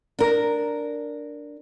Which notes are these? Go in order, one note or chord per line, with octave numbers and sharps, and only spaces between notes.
D4 A#4